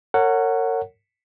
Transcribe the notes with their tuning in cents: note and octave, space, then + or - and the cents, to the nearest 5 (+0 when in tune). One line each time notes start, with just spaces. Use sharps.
A#4 -35 C#5 +0 F#5 +0